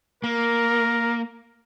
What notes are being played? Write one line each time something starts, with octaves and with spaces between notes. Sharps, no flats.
A#3 A#4